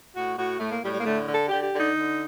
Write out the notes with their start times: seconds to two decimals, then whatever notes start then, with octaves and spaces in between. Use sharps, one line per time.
0.15 A2 F#4
0.37 A2 F#4
0.59 A2 A3
0.70 A#3
0.82 A2 G3
0.93 G3
0.99 A#3
1.04 D3 A3
1.27 D3
1.33 A4
1.48 D3 G4
1.63 G4
1.70 D3
1.78 D#4
1.92 D3